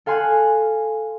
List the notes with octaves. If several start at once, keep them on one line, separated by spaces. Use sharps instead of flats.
A4 F5 G#5 C6 F#6